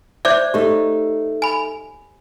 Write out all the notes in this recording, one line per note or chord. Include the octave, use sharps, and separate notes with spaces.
C5 D5 E5 D6 G6
A3 D#4 G4
G#5 B5